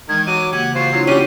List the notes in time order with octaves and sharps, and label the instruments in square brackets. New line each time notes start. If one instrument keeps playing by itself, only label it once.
[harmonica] D#3 [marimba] E3 G#3 [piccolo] G#6
[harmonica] F#3 D6 [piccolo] D#7
[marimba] C#3 A#3 [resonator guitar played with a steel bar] G4 [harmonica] F#5 [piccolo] G#6
[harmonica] F4 F#4 C5 [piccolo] C7
[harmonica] F#3 [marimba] D4 E4 F4
[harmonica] G3 F#4 G5 [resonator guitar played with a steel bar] C#4 G4 [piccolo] D#7